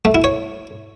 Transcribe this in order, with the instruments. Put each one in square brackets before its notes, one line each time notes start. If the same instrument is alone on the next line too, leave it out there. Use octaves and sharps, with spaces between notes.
[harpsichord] A3
E4
C#5